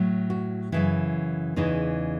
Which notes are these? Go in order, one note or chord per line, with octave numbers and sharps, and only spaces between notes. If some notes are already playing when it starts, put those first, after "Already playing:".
Already playing: A2 F#3
F#4
F#2 C#3 E3 E4
E2 C#3 E3 D#4